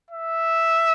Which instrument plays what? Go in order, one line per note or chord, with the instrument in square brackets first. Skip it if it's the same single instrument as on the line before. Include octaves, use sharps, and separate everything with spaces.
[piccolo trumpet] E5